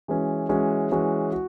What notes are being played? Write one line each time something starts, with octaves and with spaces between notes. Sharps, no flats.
E3 G#3 C#4 F#4
E3 G#3 C#4 F#4
E3 G#3 C#4 F#4
F#4